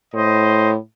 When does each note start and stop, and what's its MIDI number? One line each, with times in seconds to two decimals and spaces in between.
0.14 0.77 45
0.14 0.71 72
0.14 0.71 75